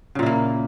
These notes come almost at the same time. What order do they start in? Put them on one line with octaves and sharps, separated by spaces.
C#3 A#2 E4 A#3